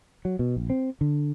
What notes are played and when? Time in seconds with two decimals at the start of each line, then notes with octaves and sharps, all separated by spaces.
0.25 F#3
0.39 B2
0.56 A#1
0.70 C4
1.01 D3